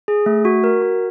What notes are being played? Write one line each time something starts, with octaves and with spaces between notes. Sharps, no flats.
G#4
A3
F#4
A#4
F#4